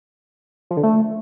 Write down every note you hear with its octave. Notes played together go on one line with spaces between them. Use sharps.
F3
D3
A3